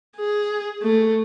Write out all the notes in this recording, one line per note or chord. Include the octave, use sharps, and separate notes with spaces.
G#4
A3